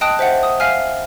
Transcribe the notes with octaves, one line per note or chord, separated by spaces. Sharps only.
D#5 G5 A5 D#6 F#6 D7
C5 E5 F#5
D#6
E5 F5 G#5 F6